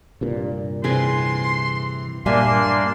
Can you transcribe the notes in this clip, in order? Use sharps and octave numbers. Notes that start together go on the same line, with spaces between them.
C2 G2 A#2
C3 E3 G#4 C6
G2 A#2 G3 A#3 D4 E5 G#5 C6